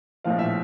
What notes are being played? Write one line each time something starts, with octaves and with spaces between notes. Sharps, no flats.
A#1 A2 F3 F5
E5